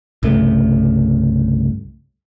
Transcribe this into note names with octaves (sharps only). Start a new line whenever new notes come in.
C2 G2 C#3 A3